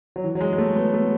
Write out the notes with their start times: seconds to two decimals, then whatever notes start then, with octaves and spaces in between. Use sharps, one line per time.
0.16 F#3
0.24 E3
0.35 F#3
0.41 G#3
0.53 G#3
0.58 A3
0.76 B3
0.94 A3